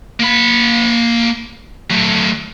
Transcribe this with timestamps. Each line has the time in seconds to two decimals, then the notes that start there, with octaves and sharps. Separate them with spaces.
0.20 A#3 B5
1.90 F#3 A3